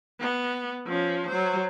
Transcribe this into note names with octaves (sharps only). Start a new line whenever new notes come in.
B3
F3 C#4
F#3 C5